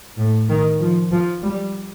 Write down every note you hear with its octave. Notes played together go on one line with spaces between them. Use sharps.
A2
D#3
F3
F3
G3